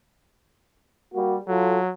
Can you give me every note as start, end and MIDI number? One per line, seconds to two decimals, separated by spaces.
1.14 1.36 55
1.14 1.36 58
1.14 1.36 66
1.48 1.92 54
1.48 1.79 65
1.48 1.79 69